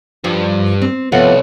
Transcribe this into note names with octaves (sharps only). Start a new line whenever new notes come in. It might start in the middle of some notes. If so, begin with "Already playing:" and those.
G2 F3
C4
C2 A2 F3 B3 F#5